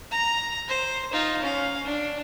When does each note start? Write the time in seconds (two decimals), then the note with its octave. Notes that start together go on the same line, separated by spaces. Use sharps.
0.11 A#5
0.68 C5
1.12 D#4 F4
1.42 C#4 F5
1.84 D4